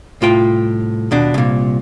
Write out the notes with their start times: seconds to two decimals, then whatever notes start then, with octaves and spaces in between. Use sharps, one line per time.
0.21 C2 A2 F4 G5
1.11 D#2 B2 D4
1.34 C2 A#2